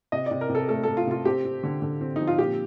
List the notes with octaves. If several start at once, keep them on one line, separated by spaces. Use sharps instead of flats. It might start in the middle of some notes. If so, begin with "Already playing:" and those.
C3 D#5
C3 D5
A#4
C3
A4
A3 A4
A3 A4
F4
C3 F4
C4 G4
C4
D3
D3
C4
F3 D#4
F4
A#2 G4